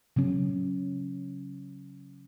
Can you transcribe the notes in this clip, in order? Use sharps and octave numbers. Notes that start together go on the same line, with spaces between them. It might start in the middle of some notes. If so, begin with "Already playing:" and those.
C#3 F#3 C#4